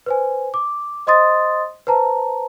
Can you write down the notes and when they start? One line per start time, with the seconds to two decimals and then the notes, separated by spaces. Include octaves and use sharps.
0.06 B4 C5 G#5
0.54 D6
1.07 C5 D#5 C6 D#6 A6
1.87 B4 C5 A5 A#5